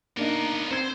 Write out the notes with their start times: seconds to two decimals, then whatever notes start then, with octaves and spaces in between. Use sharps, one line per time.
0.17 A#3 B3 D4 D#4 A#4
0.71 C4 C5 G#6